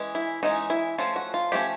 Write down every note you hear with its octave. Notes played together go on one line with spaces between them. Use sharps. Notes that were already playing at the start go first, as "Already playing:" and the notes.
Already playing: E3 G#3 C#4
E4
E3 G#3 C#4 D#4
E4
F3 A3 C#4 F4
F#4
F4
F3 A3 C#4 G4